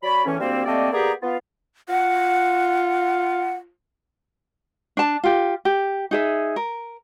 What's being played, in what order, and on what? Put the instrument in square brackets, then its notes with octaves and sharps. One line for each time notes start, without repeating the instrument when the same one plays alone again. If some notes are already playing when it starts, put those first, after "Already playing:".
[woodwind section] F#3 C#5 D5 B5
E2 A2 E3 C#4
D2 G3 A#3 C4
G3 A3 A#3 C4 D5 D#5
A#3 B3 G4 G#4 D5 A#5
B3 F4
[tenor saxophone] F4 [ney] F#5
[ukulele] D4 A5
F4 G4
G4
D#4 G#4 E5
A#4